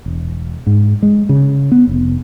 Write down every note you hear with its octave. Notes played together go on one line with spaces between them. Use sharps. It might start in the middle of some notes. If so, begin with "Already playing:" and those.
E1
G#2
G#3
C#3
B3
F1